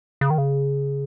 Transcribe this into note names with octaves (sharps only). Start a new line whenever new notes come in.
C#3
D#3
C#3